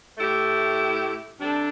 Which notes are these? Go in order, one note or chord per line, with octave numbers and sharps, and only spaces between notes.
A2 A3 E4 G4
C3 G3 D4 A4